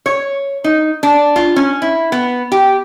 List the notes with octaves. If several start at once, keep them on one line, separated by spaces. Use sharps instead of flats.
C#5
D#4
D4
F4
C#4
E4
B3
G4